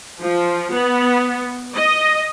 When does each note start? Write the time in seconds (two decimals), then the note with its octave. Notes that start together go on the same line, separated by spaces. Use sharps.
0.21 F3
0.73 B3
1.76 D#5